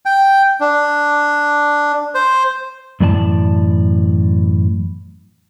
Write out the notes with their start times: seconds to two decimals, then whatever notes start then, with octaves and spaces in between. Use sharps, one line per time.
0.06 G5
0.61 D4
2.15 C5
3.00 F#2 A2 E3 D5 G#5 A5